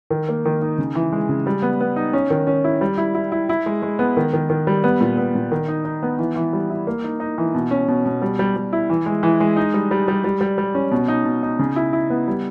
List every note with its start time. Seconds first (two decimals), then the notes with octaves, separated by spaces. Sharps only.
0.10 D#3
0.29 A#3
0.45 D#3
0.62 D#4
0.78 C#3
0.95 E3
1.12 G#3
1.29 C#3
1.46 G3
1.62 B3
1.81 B3
1.96 D#4
2.13 C#4
2.30 D#3
2.47 C#4
2.64 E4
2.81 G3
2.98 E4
3.14 E4
3.32 E4
3.49 E4
3.66 G#3
3.82 G#3
3.99 B3
4.17 D#3
4.33 D#3
4.50 D#3
4.67 G3
4.84 B3
5.01 A#2
5.17 B3
5.35 A#2
5.52 D#3
5.68 D#4
5.85 D#4
6.03 B3
6.19 E3
6.36 E3
6.53 G3
6.70 E4
6.87 A#3
7.04 D#4
7.20 D#4
7.38 E3
7.54 B2
7.71 C#4
7.88 B2
8.05 B2
8.22 G3
8.39 G3
8.56 G3
8.73 E4
8.90 E3
9.06 G#3
9.23 E3
9.40 G#3
9.56 D#4
9.74 G3
9.91 G3
10.08 G3
10.24 G3
10.41 G3
10.58 G3
10.75 C#4
10.91 B2
11.08 D#4
11.25 B2
11.43 D#4
11.59 C#3
11.76 E4
11.93 E4
12.10 B3
12.28 G3